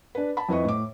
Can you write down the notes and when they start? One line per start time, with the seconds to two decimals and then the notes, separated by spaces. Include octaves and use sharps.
0.15 D4 B4
0.37 A5 B5
0.49 F2 E4 B4 D#5 C#6
0.65 A2 D6